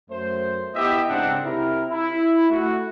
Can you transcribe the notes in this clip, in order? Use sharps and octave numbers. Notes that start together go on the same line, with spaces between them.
F#2 A3 C5
B3 E4 G4 D#5 E5
G#2 C#3 C4 D4 F#5
C3 E4 A#4
E4
A3 F#4